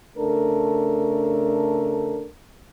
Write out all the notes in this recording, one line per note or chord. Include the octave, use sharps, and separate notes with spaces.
C#3 A3 D4 A4 A#4